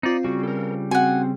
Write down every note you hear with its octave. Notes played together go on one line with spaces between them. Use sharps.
C4 D#4 F4 D5
C#3 G3 F#4
A4 A#4
C4 F#4 F#5 G#5